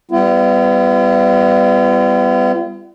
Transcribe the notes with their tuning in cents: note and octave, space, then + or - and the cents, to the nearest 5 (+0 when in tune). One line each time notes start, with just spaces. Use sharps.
G3 +15 B3 +35 F4 -45